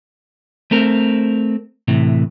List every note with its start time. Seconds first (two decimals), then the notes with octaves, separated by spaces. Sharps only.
0.71 A3 C4 A#4
1.88 A2 C3 E3